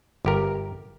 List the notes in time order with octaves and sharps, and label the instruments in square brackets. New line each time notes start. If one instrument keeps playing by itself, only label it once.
[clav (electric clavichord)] G1 G4 A#4